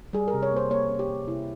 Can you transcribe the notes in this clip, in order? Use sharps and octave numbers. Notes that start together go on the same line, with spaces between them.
G3 G#4
A#4
C3
C#5
A#3 C5
A#3 C#5
C#4
G4
C3
C3 E4